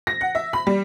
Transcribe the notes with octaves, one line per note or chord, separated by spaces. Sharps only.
A#6
F#5
E5
B5
G3